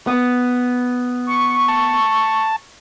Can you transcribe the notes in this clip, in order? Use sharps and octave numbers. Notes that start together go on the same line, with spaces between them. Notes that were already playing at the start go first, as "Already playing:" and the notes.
B3
C#6
A5